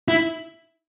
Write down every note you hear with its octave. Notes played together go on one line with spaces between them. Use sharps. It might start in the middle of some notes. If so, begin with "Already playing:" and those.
E4